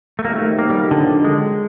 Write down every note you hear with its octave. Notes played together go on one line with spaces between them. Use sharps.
A3
F2 C3 D#3 F#3 A#3
A3
A#3
G3
D3
G#3